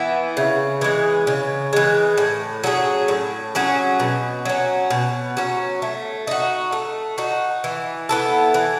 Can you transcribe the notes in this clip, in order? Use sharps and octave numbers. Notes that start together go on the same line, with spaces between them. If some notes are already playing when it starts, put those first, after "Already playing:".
Already playing: E3 B3 E4
C#3
E3 G#3
C#3
E3 G#3
A2
F#3 C#4 G#4
A2
F#3 C#4 G#4
B2
F#3 C#4
B2
F#3 C#4
A3
D#4 F#4
A3
D#4 F#4
E3
B3 E4 A4
E3